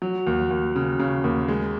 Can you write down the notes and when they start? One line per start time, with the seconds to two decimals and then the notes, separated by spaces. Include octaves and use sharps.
0.02 F#3
0.27 D#2
0.51 D#2
0.76 C#3
1.00 C#3
1.24 D#2
1.48 G#3